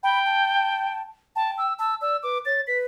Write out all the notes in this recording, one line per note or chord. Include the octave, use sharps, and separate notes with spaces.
G5 B5
A5
G5 A5
E6
A5 E6
D5 E6
B4 D6
C#5 A6
B4 B6